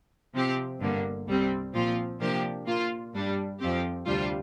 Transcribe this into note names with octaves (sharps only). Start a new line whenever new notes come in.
C3 F3 C4 G4
G1 G2 D3 A#3
C2 C3 G3 C4
A#2 F3 C4 F4
C3 F3 A#3 D4 G4
A#2 A#3 F4
G2 G3 D4
F2 F3 C4 G4
D2 C3 G3 D4 F4